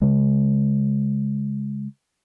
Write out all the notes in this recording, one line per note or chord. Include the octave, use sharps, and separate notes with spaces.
C#3 G#3